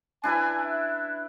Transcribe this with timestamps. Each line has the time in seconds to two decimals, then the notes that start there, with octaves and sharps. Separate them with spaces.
0.24 D4 E4 B4 G#5
0.64 E5